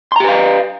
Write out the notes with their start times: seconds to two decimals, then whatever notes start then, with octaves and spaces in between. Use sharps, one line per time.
0.12 C6
0.16 A#5
0.20 G4
0.24 B4
0.29 F5